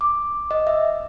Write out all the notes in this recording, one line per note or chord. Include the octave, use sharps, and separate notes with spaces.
D6
D#5
E5